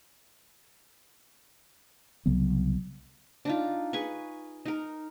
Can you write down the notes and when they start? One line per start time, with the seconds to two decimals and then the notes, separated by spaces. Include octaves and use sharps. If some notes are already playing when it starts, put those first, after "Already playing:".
2.26 C2 C#3 F#3 B3
3.45 D4 D#4 F4
3.93 G#4 B4 C#6
4.66 D#4 A#4